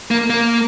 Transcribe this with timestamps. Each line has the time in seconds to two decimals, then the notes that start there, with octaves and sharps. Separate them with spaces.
0.11 A#3
0.30 A#3